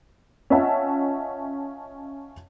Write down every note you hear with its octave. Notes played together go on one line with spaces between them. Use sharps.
C#4 F4 D#5 E5 F#5 A5